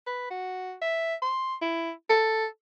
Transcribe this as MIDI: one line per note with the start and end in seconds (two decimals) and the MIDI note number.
0.07 0.26 71
0.30 0.74 66
0.82 1.15 76
1.22 1.55 84
1.62 1.92 64
2.09 2.46 69